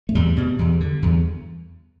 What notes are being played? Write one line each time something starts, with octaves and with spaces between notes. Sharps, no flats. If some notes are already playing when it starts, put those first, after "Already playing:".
A3
E2 G3
B2
E2
D3
E2